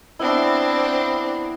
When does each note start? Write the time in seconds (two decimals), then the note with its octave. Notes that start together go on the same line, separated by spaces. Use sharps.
0.19 B3 C4 D4 E4